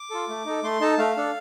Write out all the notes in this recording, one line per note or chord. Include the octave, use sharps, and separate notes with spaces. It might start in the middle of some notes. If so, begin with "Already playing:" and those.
Already playing: D6
F4 A4
A3
D#4 A4
A3 C6
D#4 A4 A5
A3 F5
D4 A4